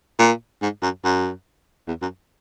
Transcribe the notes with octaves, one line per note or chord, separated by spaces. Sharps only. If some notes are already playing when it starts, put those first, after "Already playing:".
A#2
G#2
F#2
F#2
E2
F#2